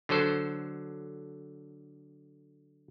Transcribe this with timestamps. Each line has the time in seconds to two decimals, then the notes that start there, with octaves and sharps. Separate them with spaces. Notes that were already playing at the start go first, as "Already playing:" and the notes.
0.09 D3 F#3 A4 C5